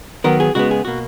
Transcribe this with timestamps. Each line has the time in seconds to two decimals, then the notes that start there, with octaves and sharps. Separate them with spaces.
0.24 D#3 F#3 B3 A#4
0.40 G#4
0.55 C#3 G#3 B3 F#4
0.71 G#4
0.85 B2 A#3 F#4